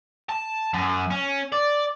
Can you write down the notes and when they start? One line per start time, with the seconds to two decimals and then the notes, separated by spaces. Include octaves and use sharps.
0.29 A5
0.74 F#2
1.11 C#4
1.52 D5